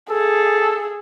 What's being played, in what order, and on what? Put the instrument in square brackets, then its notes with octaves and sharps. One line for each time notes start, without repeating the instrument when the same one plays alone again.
[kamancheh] G#4 [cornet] A4